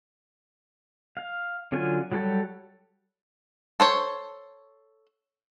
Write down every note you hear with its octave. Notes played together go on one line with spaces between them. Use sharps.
F5
D3 F#3 C#4 F4 G#5
F#3 G3 G4 A4 C#5
A4 C5 C#5